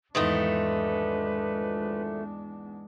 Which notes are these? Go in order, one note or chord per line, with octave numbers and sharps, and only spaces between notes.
E2 G#2 D#3 F3 G#3 A3 D4 B4